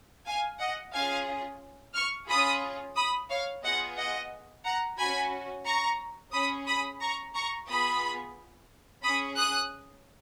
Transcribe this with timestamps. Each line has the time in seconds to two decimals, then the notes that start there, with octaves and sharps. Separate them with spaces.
0.26 F5 G#5
0.60 D#5 F#5
0.94 C#4 F4 G#4 F5 G#5
1.95 C#6 F6
2.28 C#4 F4 G#4 B5 D#6
2.96 B5 D#6
3.29 C#5 F5
3.64 B3 F4 G#4 D#5 F#5
3.97 D#5 F#5
4.65 F#5 A#5
4.98 C#4 F#4 G#5 B5
5.65 A#5 C#6
6.33 C#4 G#4 B5 D#6
6.67 B5 D#6
7.01 A#5 C#6
7.35 A#5 C#6
7.68 B3 F4 G#4 B5 D#6
9.03 C#4 G#4 B5 D#6
9.37 D#6 F#6